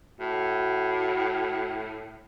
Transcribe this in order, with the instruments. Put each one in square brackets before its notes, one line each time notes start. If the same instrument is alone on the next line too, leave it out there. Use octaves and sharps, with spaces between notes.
[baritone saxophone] A2 [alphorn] F#4